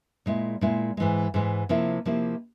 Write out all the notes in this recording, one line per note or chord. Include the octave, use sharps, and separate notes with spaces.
A#2 G#3 E4
A#2 G#3 E4
G#2 E3 G#3
G#2 E3 G#3
C3 F3 A#3 E4
C3 F3 A#3 E4